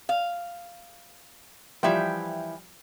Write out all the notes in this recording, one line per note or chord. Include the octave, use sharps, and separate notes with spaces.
F5
E3 F3 G3 E5 G5